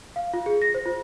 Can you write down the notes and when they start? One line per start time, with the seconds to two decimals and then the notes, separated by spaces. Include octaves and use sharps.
0.16 F5
0.34 F4
0.46 G#4
0.62 A#6
0.74 C5
0.86 F4